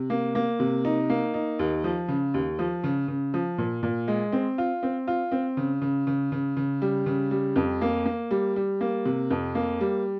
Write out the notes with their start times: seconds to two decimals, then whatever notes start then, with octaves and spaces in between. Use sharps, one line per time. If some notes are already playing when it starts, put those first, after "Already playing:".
Already playing: C3
0.10 A#3
0.35 A#3
0.60 C3
0.85 D#4
1.10 A#3
1.34 D#4
1.59 D#2
1.84 F3
2.08 C#3
2.34 D#2
2.59 F3
2.84 C#3
3.08 C#3
3.34 F3
3.58 A#2
3.83 A#2
4.08 G#3
4.32 C4
4.58 F4
4.83 C4
5.07 F4
5.32 C4
5.57 C#3
5.82 C#3
6.07 C#3
6.32 C#3
6.57 C#3
6.82 G3
7.06 C#3
7.31 G3
7.56 F2
7.81 A#3
8.06 A#3
8.31 G3
8.56 G3
8.81 A#3
9.05 C3
9.30 F2
9.55 A#3
9.81 G3